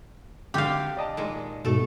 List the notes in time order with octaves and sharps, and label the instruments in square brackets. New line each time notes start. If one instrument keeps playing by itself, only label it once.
[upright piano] G#1 D3 G6 [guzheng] G4 F5
[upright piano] D5 D#5 A5
[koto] A#2 D#3 G#3
[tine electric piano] G#2 B2 [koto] A3 A4